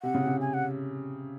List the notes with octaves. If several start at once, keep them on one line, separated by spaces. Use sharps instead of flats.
C3 F#5
C#3
C3
G#5
F#5